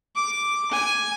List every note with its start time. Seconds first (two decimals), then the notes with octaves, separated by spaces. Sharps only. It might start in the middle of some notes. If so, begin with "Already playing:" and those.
0.15 D6
0.71 G#5